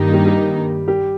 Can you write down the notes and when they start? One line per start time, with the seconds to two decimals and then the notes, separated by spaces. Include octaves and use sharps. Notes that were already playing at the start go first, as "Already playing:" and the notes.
Already playing: G2 D#3 G3 A#3 D#4 G4
0.13 G3 G4
0.26 G3 G4
0.88 G3 G4